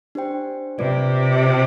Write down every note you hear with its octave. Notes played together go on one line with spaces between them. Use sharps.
D4 G4 C5 G5
C3 F4 B4 D5
G4 C5 G5